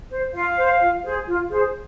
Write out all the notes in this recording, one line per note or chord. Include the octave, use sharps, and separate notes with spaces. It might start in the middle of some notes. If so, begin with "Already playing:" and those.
C5
F4 F5
C5
F4
G#4 C5
F4
G#4 C5